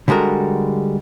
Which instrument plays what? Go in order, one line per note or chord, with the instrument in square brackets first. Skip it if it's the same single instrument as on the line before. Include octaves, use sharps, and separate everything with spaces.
[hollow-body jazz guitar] D3 G3 G#3 F#4 A#4